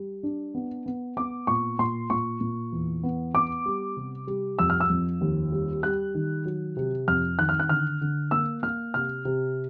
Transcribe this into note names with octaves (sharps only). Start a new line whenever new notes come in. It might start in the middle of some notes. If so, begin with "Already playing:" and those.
Already playing: G3
D4
B3
B3
B3 D6
A#2 C#6
A#2 C6
A#2 C#6
A#2
E2
B3
B3 D6
G3
C3
G3
F2 E6
F6
E6
F2
D#2
G3
G3 F#6
D#3
F#3
C3
F2 F6
D#3 F#6
F6
F#6
D3 F6
D3
A#3 E6
A#3 F6
C3 F6
C3